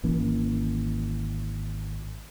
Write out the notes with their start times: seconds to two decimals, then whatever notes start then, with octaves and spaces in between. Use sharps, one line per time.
0.03 G#1 E3 A#3 C#4